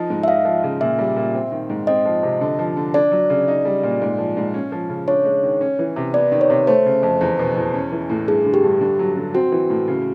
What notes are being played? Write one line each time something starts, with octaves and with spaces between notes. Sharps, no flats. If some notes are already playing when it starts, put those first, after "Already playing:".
Already playing: F3 D#4
G#2
E5
D#4 F5
F3
C#3
A#2 E5
G3
A#2
C4
D#3
G#2
C4 D#5
F3
C3
D3
F3
D3
D4 D5
F#3
C#3
D#4
G3
A#2
G#2
F3
G#2
C#4
F3
C#3
D4 C#5
G#3
D#3
C#4
E3
C3
B3 D5
D#3
C#5
C3
A3 C5
C#3
F2
E2
B2
E2
C#4
E3
A2
G2 G#4
D3
G4
G2
D3
F#3
D3
C4 F#4
E3
A2
C#3